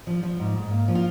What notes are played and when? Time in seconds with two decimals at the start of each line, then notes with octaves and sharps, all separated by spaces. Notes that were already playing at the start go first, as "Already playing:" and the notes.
0.07 F3
0.23 F3
0.39 G#2
0.55 G#2
0.71 A#3
0.88 F3
0.95 F4